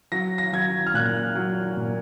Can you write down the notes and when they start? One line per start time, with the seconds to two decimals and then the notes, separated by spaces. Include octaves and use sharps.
0.12 F#3 A#6
0.38 A#6
0.53 F#3 G#6
0.87 F6
0.94 A#2 F#6
1.35 F#3
1.77 A#2